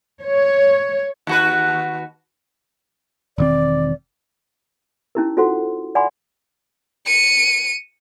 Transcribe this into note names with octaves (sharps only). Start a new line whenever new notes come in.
C#5
D#2 F#4 B4
E1 D#3 C4 D5
C#4 D#4 E4 G4 A#4
F4 F#4 A4 C5 F#5 C6
D5 F#5 G#5 B5 C6 D6
C#7 D#7